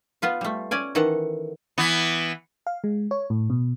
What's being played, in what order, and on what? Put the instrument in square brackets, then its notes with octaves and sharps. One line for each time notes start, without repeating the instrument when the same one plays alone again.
[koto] B3 F4 B4
G3 A3
C#4 D5 G#5
D#3 E3 A4 F#5
[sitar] E3 B3
[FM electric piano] F5
G#3
C#5
A2
B2